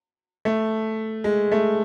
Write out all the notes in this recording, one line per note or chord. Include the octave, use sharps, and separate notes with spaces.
A3
G#3
A3